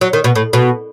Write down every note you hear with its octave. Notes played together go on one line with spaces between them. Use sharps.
F#3
D#3
B2
A2
B2